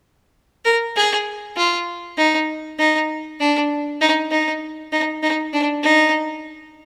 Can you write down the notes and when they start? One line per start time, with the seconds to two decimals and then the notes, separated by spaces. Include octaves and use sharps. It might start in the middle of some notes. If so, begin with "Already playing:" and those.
0.65 A#4
0.96 G#4
1.57 F4
2.18 D#4
2.79 D#4
3.39 D4
4.01 D#4
4.31 D#4
4.92 D#4
5.23 D#4
5.53 D4
5.83 D#4